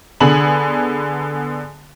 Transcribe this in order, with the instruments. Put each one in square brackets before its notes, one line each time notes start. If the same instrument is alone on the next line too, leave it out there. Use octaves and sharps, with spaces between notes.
[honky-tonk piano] D3 B3 G#4 G#5 B5 F#7